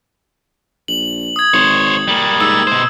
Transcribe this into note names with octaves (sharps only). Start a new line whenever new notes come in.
A#1 F#7
D#6 G#6
G#1 C5 C#5
G3 A#3
G#2 E6
B2 C5